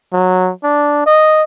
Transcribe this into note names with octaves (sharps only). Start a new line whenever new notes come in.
F#3
D4
D#5